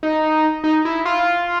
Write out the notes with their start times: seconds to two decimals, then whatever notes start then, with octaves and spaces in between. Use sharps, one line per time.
0.03 D#4
0.64 D#4
0.85 E4
1.05 F4